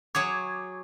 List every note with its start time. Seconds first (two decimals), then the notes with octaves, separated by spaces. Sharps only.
0.15 F#3 G#4 C#5 D6 G#6